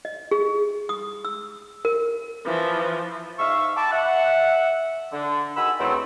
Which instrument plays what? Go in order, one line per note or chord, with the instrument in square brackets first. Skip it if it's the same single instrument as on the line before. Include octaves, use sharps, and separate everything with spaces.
[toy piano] D#5
G#4
D#6
E6
A#4
[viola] E3 F3
[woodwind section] G#2 E5 F5 C#6
G5 A5 B5 D6
E5 F#5
D3
D#3 F#4 G#4 B5 E6
E2 F#3 A3 B3 C4